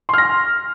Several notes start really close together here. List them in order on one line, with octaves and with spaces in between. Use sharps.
C6 F6 A#6